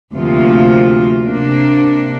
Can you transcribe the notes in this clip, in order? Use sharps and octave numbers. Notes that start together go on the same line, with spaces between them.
D2 C3 F3 A#3 F4
C3 A#3 D4